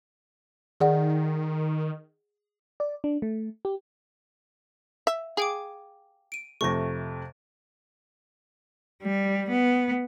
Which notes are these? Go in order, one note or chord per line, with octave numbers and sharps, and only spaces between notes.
D#3 G#4 D5 F#5
D5
D4
A3
G4
E5
G#4 F5 G5 D6
D7 D#7
F2 C3 A3 C#6 A#6
G3
B3